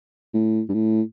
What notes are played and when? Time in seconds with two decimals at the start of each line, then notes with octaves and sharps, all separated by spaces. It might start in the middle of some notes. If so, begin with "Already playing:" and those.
0.34 A2
0.69 G2
0.74 A2